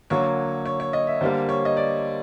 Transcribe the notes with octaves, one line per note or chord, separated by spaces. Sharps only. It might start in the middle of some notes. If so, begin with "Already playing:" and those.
D3 F#3 A#3 C#5
C#5
C#5
D#5
E5
D3 G3 A#3 C5
C#5
D#5
D5